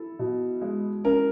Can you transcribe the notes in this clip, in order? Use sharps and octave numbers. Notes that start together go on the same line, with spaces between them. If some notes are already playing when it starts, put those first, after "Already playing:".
Already playing: E4 A4
B2
G#3
C#4 A#4